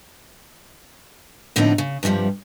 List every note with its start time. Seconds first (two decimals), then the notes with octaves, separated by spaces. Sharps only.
1.56 A2 D3 F3 B3 C4 D#4
1.78 C#3
2.03 G2 C3 E3 F3 G3